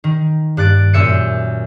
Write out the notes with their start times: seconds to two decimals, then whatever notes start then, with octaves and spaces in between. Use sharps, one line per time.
0.04 D#3
0.57 G2 F#6 A6 D7
0.93 F#2 A#2 E5 G6 C#7 D#7